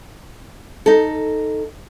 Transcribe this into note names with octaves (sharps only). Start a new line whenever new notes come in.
D#4 A4